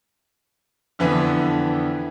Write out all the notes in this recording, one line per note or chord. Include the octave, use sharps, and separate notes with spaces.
F2 D3 E3 B3